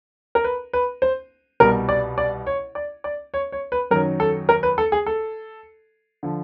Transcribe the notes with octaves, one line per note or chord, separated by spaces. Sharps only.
A#4
B4
B4
C5
C2 B2 G3 A#4
D5
D5
C#5
D5
D5
C#5
C#5
B4
F#2 D#3 F#3 A#4
A4
A#4
B4
A4
G#4
A4
D3 F3